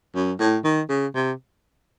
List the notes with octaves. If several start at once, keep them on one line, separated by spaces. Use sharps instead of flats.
F#2
A2
D#3
C#3
C3